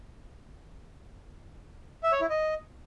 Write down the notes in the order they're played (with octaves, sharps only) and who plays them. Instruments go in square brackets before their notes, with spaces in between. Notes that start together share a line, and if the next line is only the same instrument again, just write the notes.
[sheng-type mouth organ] E5
C#5
E4
D#5